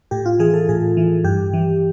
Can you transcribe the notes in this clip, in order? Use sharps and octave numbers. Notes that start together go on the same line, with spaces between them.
A2 G4
F4
E3 G#4
A4
A2 G#4
E3
G2 G4
E3